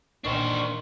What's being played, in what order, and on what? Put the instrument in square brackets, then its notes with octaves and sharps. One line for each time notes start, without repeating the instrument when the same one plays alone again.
[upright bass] A#2 G3 [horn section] D#3 [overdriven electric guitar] D4 C5 [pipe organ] C#6